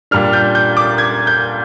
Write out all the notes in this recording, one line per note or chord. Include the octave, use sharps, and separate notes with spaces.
A#2 G3 D4 F6
G6
G6
D6
G#6
G6